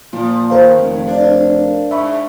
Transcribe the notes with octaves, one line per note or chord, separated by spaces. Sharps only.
A#2 F3
D#3 A#4 C5 F5
F1 D#2
D4
G#2 E5 B5 C#6